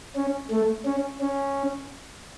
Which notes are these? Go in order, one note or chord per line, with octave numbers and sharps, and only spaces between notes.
C#4
A3
C#4
C#4